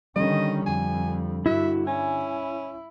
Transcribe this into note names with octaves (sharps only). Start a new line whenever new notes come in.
D3 D#3 G3 C#4 D#5
F2 G#5
G2 E4 F#4 E5
C#4 E4 G#5